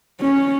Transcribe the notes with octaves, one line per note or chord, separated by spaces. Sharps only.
C#4